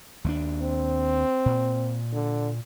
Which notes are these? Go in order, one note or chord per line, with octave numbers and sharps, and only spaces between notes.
D#2 G#3 D4
C4
A#2
D3